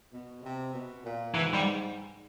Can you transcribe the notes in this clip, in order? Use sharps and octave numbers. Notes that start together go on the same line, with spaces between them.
B2
C3
B2
A#2
G#2 E3
G3